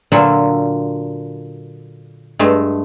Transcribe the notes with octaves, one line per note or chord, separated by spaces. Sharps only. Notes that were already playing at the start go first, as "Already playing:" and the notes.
A#2 D3 F#3 F4 E5 B5
G2 G#3 A3 A5